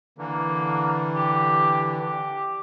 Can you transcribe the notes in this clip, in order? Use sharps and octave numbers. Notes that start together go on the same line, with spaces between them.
D3 E3 A#3
G4
G4